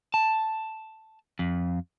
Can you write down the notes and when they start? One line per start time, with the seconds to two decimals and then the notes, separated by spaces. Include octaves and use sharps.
0.14 A5
1.39 F2